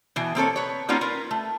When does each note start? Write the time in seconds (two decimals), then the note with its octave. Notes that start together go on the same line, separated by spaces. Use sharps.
0.16 B2 E3
0.35 A#3 C4 A4 C#5
0.56 B4 C#5
0.88 G3 A#3 B3 C#4 D#4 F4
1.01 F4 A#4 B4
1.31 A3